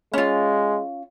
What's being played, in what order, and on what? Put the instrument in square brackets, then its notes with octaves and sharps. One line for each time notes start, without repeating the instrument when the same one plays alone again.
[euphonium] G#3 [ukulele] C#4 F4